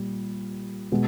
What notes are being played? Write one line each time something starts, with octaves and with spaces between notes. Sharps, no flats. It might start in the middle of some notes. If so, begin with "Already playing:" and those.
Already playing: A#2 G3
B2 G#3